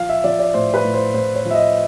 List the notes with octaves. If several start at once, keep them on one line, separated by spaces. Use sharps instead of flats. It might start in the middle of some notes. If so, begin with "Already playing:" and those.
Already playing: F3 F5
E5
F3 D5
D5
A2 C5
B4
A2
C5
A2 C5
C#5
F3
E5
D#5